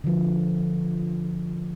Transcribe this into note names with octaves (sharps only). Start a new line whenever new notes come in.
D3 F3